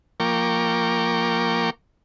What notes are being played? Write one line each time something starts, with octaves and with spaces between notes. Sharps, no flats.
F3 A#3 A#4 G5 C#6 D6